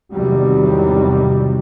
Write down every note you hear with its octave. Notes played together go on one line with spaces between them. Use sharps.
E2 G#2 C3 D#3 F#3 G3